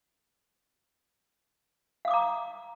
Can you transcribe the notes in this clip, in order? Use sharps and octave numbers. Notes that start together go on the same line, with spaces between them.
F5 A#5 D6 D#6